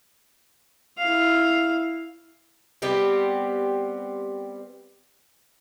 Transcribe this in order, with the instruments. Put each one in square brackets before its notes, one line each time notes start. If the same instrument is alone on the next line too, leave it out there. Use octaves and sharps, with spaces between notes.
[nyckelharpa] E4 F5
[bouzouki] G3 B3 C4 G4